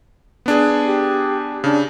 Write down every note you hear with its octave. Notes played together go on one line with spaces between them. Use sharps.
B3 D4 G#4
G4
C#3 D4